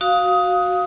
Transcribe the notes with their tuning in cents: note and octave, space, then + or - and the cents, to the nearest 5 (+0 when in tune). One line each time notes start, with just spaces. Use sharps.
F#4 +0 F5 +10 D#6 +15